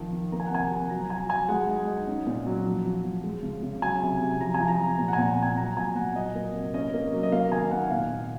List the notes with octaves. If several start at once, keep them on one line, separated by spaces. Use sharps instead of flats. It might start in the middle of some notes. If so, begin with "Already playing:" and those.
Already playing: D#3 F3 D#4
F3
A#3 A#5
G#5
F#5
C3 G#5
C3
F#3 A#5
F#3 G#5
F#3 G#5
G#3 F#5
D#4
D#4
C#4
A#2
F#3
F3
F3
F3
G#3
C#3
C#3
F#3 G#5
C3
C3
F3 A#5
G#5
F3
A#5
F3
A#2 A#5
F#5
G#5
A#2
A#5
C4 G#5
F#3 A#5
A#2 G#5
A#2 F#5
F#3 D#5
A#3
C3
C#4 D#5
A#3
F#3
D#5
A#3 F5
D#3 G#5
A#3 F#5
A#2 F5
A#2